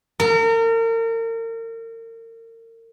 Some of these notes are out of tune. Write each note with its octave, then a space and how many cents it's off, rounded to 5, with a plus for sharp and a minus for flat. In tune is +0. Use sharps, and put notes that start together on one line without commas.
A#4 -35